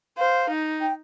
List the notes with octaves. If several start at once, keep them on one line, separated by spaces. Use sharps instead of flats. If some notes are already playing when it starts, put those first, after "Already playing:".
C5 F5
D#4
G5